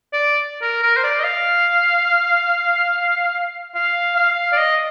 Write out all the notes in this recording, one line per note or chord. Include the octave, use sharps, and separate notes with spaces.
D5
A#4
A#4
C5
D5
D#5
F5
F5
F5
D5
D#5